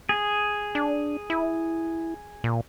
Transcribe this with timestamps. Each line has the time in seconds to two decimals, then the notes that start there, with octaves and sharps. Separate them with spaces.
0.09 G#4
0.75 D4
1.30 E4
2.44 A#2